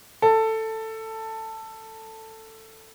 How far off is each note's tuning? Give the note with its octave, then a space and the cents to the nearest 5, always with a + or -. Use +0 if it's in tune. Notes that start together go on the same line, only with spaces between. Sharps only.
A4 +10